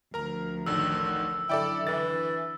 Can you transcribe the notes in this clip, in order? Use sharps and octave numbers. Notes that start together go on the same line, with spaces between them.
D2 F3 A#4 A#5
A1 D3 D#3 E6
F#2 D3 E4 A4 D5 G5
D3 E3 A6